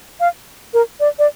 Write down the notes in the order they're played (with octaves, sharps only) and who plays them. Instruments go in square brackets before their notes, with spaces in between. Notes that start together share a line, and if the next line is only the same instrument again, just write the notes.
[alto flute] F5
A#4
D5
D5